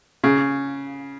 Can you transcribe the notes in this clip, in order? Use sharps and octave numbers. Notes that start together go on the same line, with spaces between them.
C#3